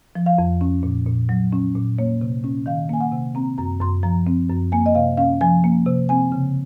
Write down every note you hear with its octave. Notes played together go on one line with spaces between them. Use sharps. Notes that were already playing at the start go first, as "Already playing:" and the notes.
F3
F5
F2
C#4
A#2
A#2
F#3
C#4
A#2
A#3 C#5
C3
C#4
D#3 F5
A#3 G#5
F#5
C3
C4 A#5
F#2 A#5
F#2 C6
F3 A#5
C4
F#2
A#3 G#5
D#5
C3 F5
C#4 F5
F3 G#5
A#3
C3
C4 G#5
C#3